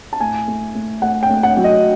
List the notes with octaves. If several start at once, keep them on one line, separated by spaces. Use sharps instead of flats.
A5
A2 G#5
A3
A3
A3 F#5
G5
A3
F#5
F#3
D#5